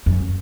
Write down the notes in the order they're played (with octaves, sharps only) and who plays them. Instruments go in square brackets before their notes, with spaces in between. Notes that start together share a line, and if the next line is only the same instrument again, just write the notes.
[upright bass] F#2